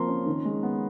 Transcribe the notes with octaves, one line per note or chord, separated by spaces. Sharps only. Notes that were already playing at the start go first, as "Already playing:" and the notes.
Already playing: F3 A#3 C4 A#5 C6
C#4
D#3
G#3
B3